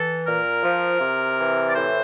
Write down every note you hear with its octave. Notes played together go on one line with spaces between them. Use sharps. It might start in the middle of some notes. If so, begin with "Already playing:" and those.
Already playing: E3 A4
A#2 A#4
F3
C3
E3
D5
A2 C5